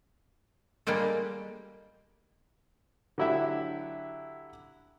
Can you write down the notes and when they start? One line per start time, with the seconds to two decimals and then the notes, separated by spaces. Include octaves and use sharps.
0.87 G3 G#3 A#3 G4 A4
3.18 D3 F#3 E4 G4 E5